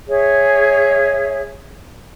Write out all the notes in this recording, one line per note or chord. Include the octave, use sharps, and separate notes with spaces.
G#4 C#5 E5